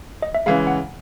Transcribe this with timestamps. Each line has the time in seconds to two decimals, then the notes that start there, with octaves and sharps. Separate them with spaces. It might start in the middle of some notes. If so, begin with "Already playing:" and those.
0.22 D#5
0.34 E5
0.46 C#3 E3 G#3 F5
0.67 F#5